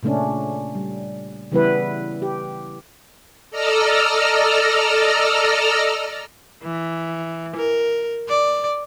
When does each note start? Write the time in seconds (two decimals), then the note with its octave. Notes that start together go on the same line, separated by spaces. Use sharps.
0.03 A#2 C#3 A3 C#4 D4
0.75 G3
1.52 C#3 E3 G3 B3 E4 B4
2.22 G4
3.51 A4 D5 D#5 A#5 E6 F6
6.63 E3
7.56 A#4
8.29 D5